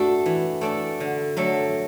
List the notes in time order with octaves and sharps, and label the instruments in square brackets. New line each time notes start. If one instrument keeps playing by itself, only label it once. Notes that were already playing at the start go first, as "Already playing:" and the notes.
Already playing: [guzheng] A3 D4 A4 D5 [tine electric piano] F#4
[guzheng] E3
A3 D4 A4 D5
D3
F#3 A3 D4 A4